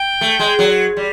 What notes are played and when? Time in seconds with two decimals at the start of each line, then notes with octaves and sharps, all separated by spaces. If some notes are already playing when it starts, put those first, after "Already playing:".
Already playing: G5
0.21 A3
0.39 G#3
0.59 F#3
0.97 G3